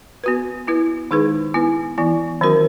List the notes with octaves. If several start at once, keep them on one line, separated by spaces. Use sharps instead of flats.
B3 F#4 B4
B3 E4 B4
D#3 G#3 D#4 G#4 B4
B3 E4 B4
E3 B3 E4
D#3 F#3 C#4 F#4 A#4